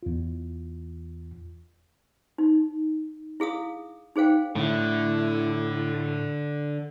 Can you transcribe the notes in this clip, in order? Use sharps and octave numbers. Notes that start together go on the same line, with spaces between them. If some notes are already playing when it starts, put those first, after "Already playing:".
E2 F4
D#4
E4 G#4 F5 D#6
D#4 G#4 C5 F5 G5
A2 D3 A3 E4